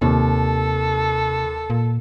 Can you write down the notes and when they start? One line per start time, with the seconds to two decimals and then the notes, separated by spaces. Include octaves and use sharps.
0.02 D#2 C3 A4
1.70 A#2